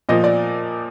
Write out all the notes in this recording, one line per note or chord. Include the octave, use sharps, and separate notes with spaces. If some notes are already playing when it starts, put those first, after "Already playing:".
A#2 F3 D#5
D5